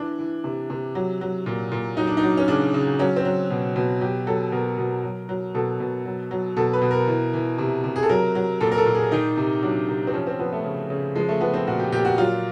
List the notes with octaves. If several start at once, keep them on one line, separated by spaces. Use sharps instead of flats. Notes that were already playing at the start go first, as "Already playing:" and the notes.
Already playing: E3 D4
E3
C3
C3
F#3
F#3
A#2
A#2
F#3 D#4
D4
D#4
F#3
C#4
C#3 D4
C#3
F#3 C#4
C4
F#3
B2
B2
F#3 G4
F#3 A4
B2 A#4
B2
F#3
F#3
B2 A4
B2
F#3
F#3
B2 A4
B4
B2
A#4
E3
E3
C3
C3
G#4
A4
F#3 A#4
F#3
A#2 A4
A#4
A4
A#2
G#4
D#3 D#4
C3
F#3 D4
C3
C4
F3 C#4
C4
F3 B3
A3
C#3
C#3
F3 G#3
A3
F3 B3
C4
A#2 F#4
G4
A#2 G4
F#4
F#3 F4